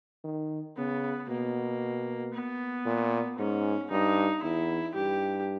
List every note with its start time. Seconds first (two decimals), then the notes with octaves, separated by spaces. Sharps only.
0.24 D#3
0.77 C#3 B3
1.29 B2 A#3
2.34 B3
2.85 A#2
3.38 G#2 C#4
3.90 G2 D#4
4.42 E2 E4
4.94 G2 G4